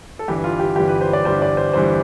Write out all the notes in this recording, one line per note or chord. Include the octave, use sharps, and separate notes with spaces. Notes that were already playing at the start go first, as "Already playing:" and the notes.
A4
G1 G2 E3 G3 G4
F4
G4
G1 G2 E3 G3 G4
B4
C5
D5
G1 G2 E3 G3 C5
D5
C5
G1 G2 E3 G3 C5